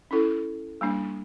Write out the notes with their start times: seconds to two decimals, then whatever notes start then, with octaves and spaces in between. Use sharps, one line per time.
0.11 C#4 E4 A4
0.81 G3 A#3 D4